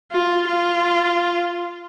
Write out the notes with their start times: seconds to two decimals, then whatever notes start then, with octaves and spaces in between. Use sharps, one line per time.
0.12 F4
0.47 F4